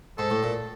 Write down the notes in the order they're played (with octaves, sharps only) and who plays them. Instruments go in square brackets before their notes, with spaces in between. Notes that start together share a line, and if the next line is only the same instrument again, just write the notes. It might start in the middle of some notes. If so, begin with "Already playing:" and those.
[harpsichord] G#2 [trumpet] A4
[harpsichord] A2
A#2